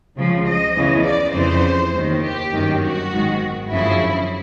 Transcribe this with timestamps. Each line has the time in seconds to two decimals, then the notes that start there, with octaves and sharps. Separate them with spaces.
0.16 C#2 C#3 F3
0.46 D#5
0.75 E2 C#3 E3
1.05 D5
1.34 F2 C#3 E3 C5
1.93 D#2 D#3
2.22 G4
2.52 G1 F#2 D#3
2.81 F#4
3.12 G#1 G#2 D#3
3.70 G1 F#2 C#3 F3 E4